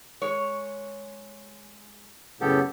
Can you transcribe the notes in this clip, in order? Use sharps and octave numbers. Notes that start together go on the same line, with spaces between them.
G#3 C#5
F#2 A2 C#3 B3 G4 A4